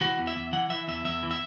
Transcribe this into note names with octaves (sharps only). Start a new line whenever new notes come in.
E3 F#4
E2
E5
E2
E3 F#5
E3 E5
E2 E5
E2 E5
E3
E5